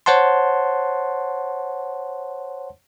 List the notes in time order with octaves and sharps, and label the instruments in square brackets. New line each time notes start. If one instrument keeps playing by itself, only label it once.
[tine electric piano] C5 C#5 F#5 A5 C6